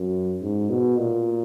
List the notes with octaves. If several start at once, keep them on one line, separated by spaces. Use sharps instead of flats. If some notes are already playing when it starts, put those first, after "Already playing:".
Already playing: F#2
G#2
B2
A#2